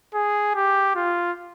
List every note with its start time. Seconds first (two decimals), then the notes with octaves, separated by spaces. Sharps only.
0.14 G#4
0.55 G4
0.95 F4